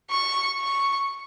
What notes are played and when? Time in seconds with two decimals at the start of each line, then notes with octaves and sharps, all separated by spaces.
0.10 C#6
0.60 C#6